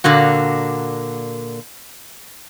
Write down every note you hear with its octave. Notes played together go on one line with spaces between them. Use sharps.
A#2 D3 A#3 F#4